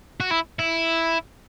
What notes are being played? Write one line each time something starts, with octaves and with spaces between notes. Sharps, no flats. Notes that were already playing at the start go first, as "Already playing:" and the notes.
F#4
E4
E4